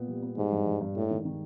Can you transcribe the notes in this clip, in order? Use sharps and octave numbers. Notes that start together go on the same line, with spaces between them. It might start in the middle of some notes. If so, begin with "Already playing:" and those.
Already playing: A#2 B3
G3
B3
G#2 G3
G2
G2
G2
A2 G#3
D#3
D#3